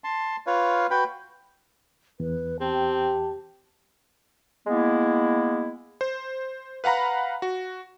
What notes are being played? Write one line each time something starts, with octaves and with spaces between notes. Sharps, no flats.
A5 C6
F4 B4 C#5 F5
F#4 B4 G5 B5
E2 B4
C4 G4 A5
G#3 A#3 B3 E4
C5
B4 F5 F#5 A#5 B5
F#4